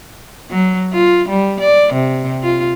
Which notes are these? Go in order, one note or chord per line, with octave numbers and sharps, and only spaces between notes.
F#3
F4
G3
D5
C3
F4